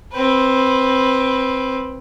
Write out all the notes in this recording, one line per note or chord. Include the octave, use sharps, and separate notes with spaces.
C4 B4